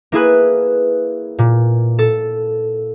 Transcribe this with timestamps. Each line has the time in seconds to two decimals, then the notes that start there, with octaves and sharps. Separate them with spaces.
0.12 A#3 E4 G#4 B4
1.39 A#2
1.99 A4